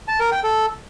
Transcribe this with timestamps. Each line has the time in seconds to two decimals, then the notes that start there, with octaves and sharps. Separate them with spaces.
0.08 A5
0.20 A#4
0.32 G5
0.44 A4